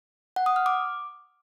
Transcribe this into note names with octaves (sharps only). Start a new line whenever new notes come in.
F#5
D#6
F6
D6